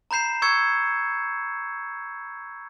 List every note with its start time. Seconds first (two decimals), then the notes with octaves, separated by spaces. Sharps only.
0.11 A#5 B5 G6 C7 E7
0.42 C#6 E6 G#6 C#7